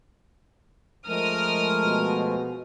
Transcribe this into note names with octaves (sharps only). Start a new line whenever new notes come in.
F3 G#3 A3 A#4 D#6 F6
B2